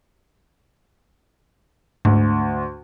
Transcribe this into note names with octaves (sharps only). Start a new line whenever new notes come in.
D2 G#2